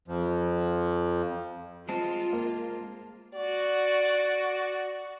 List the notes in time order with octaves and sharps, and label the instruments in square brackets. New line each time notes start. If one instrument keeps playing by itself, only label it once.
[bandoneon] F2 F3
[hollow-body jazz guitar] G#3 C4 [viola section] F4 [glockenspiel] A5
[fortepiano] A#3
[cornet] F#4 [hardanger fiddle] D5